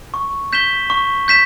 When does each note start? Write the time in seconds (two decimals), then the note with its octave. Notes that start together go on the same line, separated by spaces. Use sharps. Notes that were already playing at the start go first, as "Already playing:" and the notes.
0.14 C#6
0.53 G6 B6 E7 G7
0.90 C#6
1.28 G6 B6 E7